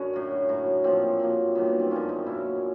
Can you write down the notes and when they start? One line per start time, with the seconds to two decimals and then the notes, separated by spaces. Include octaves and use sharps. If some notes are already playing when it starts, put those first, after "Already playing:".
Already playing: F#2 D3 C#4
0.13 A2 F#3
0.49 A2 F#3
0.84 A#2 F3 C4
1.20 A#2 F#3
1.55 G2 D#3 F#3 B3
1.80 C4
1.91 F#2 D3 F3 C#4
2.09 D#4
2.26 A#2 F#3 E4